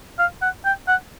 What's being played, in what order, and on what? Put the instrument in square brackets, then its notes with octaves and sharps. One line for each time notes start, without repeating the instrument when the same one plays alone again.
[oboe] F5
F#5
G5
F#5